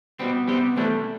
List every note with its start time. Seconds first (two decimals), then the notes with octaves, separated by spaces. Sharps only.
0.19 B2 G3 B3 C4
0.48 C3 G3 B3 C4 G4
0.76 C3 E3 G3 A3 D4